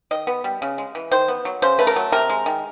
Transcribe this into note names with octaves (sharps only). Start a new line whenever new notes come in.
D#3 D#5
B3
G3
C#3
G#3
E3
D#3 C5
B3
F#3
C#3 C5
A3 B4
A#4
F#3
C3 A#4
G#3
D#3